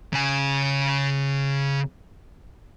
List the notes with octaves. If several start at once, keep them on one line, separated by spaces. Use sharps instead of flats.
C#3 G#5